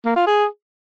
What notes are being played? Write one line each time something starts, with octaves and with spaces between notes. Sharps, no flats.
A#3
F4
G#4